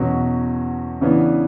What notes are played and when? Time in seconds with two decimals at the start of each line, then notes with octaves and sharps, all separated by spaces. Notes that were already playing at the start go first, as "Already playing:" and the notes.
Already playing: E2 B2 F#3 C#4
1.01 C#3 E3 B3 D4